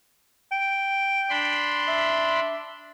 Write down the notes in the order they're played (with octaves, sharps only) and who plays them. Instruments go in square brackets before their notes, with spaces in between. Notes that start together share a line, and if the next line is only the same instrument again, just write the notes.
[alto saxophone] G5
[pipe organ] D4 B5 C6
[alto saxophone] E5